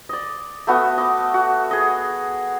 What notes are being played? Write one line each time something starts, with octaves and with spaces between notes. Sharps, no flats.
D5 D#5
A3 B3 F#4 D#6
D#5 D6
F#4
G#4 D#5